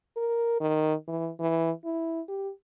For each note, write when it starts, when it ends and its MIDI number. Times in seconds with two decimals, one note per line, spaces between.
0.17 0.55 70
0.60 0.94 51
1.08 1.29 52
1.39 1.71 52
1.85 2.21 64
2.28 2.50 67